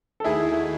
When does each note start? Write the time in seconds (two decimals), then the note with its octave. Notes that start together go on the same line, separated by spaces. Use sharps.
0.20 A4
0.24 D#2 D#3 A3 D#4 E4 F#4 G#4